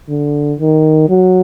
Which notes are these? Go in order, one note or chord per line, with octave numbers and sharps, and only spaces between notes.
D3
D#3
F#3